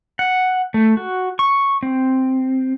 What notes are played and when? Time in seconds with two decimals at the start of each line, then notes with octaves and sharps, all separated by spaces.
0.19 F#5
0.74 A3
0.97 F#4
1.39 C#6
1.83 C4